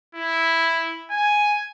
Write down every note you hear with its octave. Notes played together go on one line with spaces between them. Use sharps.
E4
G#5